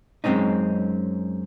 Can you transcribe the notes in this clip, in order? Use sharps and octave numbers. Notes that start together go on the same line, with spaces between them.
F#2 G#3 C4 C#4 D#4